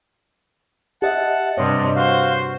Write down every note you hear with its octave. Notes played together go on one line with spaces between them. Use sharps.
G4 D#5 E5 F#5 A5
G2 C3 C#5 D#5 C6
F#4 C5 F5